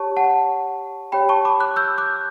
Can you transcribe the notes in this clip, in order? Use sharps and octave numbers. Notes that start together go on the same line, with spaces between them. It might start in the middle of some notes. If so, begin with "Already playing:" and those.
Already playing: G4 C#5 A5 C#6
F#5 A5
G4 C#5 G5 B5
A5 C#6
B5 D6
D6 F#6
E6 G6
D6 F#6